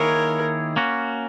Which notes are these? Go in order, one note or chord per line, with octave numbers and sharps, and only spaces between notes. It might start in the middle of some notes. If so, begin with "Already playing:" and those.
Already playing: D#3 A#3 E4 G#4 A#4 C#5
A#3 C#4 F#4